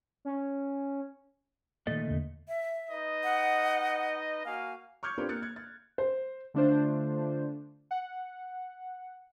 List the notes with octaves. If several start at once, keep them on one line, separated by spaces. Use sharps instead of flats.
C#4
A#2 D#3 A3 D#5 A6
E2 D3
E5
D#4 B4 D#5
F#5
A#3 F#4 F5 G#5
C#6 D6 F6 G6 G#6 C#7
C4 D4 F4 G4 A#4 B4
A#3 F#6 A6 C#7
F#6 G#6
A6
C5
D3 A3 D4 F4 C5
F#5